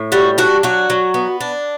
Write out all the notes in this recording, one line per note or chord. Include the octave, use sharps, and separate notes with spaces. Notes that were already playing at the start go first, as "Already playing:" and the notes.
Already playing: A2
G3 F#4
D4 F#4
F#3 F#4
F#3
B3
D4